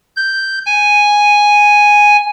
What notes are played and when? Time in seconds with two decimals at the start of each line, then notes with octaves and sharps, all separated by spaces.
0.16 G6
0.66 G#5